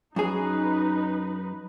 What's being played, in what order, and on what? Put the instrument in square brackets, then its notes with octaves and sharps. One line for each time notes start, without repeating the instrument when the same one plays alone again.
[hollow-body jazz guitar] F#2 G#4 [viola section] D#4 B4